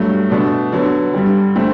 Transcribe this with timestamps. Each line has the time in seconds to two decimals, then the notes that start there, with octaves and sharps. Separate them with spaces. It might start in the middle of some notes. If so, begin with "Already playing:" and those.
Already playing: G2 F#3 A3
0.30 B2 A3 D4
0.72 D3 F#3 B3
1.14 G2 D3 G3
1.55 D3 A3 C4